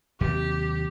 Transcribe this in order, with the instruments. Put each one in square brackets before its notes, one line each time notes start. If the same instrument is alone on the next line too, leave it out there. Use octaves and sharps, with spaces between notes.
[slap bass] D#2 C3 F#3 [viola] G4